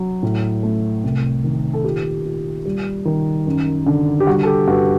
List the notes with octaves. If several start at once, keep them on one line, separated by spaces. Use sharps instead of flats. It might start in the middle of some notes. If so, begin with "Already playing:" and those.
Already playing: F#3
A2
A3
C2
D#3
A4
A#2 G4
A#2
G3
D#3
F#2
D3
G4
G3 F#4
A4
G4
G2 F#4